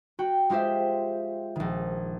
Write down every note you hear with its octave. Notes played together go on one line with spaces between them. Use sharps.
F#4 G5
G#3 F4 G4 C5 E5
A#1 D#3